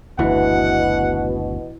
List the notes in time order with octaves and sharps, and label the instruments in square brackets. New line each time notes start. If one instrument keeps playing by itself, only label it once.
[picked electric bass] F#1 D2 [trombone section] B2 [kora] E3 [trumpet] F#5